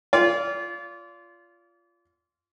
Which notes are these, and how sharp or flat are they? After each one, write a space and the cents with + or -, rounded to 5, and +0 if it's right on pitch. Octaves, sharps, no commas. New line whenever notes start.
F4 -10 D5 -35